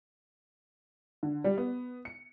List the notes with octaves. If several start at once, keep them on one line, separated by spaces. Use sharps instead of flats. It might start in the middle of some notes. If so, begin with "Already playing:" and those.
D3
G3
B3
C#7